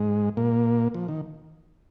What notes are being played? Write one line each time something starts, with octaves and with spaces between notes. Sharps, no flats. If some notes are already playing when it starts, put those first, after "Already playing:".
Already playing: G#2 G#3
A#2 A#3
F3
D#3